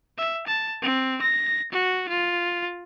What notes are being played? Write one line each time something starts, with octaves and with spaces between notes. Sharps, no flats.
E5
A5
C4
A#6
F#4
F4